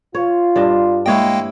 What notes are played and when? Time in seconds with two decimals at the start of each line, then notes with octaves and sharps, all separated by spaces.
0.15 F4 C#5
0.56 G2 D4 D#5
1.06 G#3 A#3 E4 C#5 D#5 G5